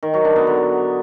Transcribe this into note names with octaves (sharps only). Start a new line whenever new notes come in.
D#3
F#3
D4
B3
D3